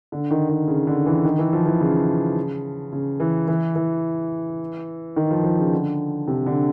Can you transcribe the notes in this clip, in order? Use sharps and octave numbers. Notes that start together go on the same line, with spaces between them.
D3
D#3
D#3
C#3
D3
E3
D#3
E3
F3
E3
C#3
C#3
E3
E3
E3
D#3
F3
F3
C#3
D3
C3
D3